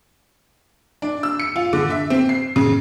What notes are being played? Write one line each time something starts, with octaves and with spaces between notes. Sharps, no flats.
D4
E6
C#7
F4
D3
E5
C4
C7
C#3